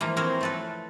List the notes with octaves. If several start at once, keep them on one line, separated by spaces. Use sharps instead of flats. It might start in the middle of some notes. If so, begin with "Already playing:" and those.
E3 F3 A#3
C4 A#4 C5 C#5
A3 A4 B4